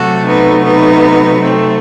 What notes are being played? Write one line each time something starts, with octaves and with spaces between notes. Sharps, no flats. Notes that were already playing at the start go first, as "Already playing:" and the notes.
Already playing: C3 F#3 A3 F#4 A4
B3 D#4
B3 D#4
A3 C4